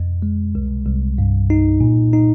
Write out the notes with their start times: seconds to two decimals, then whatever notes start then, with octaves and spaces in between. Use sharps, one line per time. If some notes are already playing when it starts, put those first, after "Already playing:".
Already playing: F2
0.22 G#3
0.55 C2
0.86 C2
1.18 G2
1.50 D#4
1.81 A#2
2.13 D#4